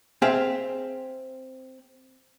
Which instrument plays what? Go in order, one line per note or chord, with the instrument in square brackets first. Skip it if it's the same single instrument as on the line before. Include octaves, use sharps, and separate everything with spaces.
[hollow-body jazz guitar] C4 G#4 E5 F5